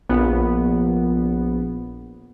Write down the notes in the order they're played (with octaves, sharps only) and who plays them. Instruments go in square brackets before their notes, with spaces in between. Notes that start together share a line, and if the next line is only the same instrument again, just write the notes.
[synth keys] A#1 B3